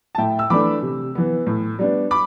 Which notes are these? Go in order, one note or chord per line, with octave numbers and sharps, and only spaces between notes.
A5
A2 E5 G5
E6
E3 A3 D4 B5 D6
C3
E3 B3
A2
G3 B3 D4
B5 D6